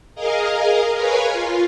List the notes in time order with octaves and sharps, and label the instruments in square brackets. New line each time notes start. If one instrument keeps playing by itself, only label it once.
[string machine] G#4 A#4 D#5 F5
A#4 B4 C#5 F5 G#5
F4